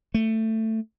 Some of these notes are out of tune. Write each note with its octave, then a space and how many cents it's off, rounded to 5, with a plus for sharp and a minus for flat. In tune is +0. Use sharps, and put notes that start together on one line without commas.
A3 +15